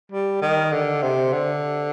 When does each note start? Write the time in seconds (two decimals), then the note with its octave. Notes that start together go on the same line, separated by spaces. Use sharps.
0.12 G3
0.42 D#3
0.72 D3
1.03 C3
1.33 D3